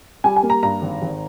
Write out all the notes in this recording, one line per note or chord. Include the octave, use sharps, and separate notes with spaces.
G3 G#5
G#5
A#3
A#5
G2 A#5
G#1
G#1